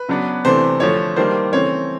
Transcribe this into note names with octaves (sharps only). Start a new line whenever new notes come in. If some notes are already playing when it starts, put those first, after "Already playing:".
Already playing: B4
C#3 F#3 B3 D4
C3 E3 A3 D4 C5
D3 F3 A3 C#5
D#3 G3 A#3 D4 C5
C#3 E3 A3 C4 C#5